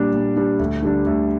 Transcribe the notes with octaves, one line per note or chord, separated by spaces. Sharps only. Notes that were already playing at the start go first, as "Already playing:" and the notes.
Already playing: A#2 G3 D4
A#2
G3 D4
D2
D3 G3 D4
D2